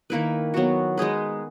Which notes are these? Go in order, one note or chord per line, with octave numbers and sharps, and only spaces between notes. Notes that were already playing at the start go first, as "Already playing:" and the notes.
D#3 A#3 E4 B4
F#3 B3 F#4
G#3 D#4 G#4 B4